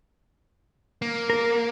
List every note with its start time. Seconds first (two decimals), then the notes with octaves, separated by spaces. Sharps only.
1.02 A#3
1.30 A#4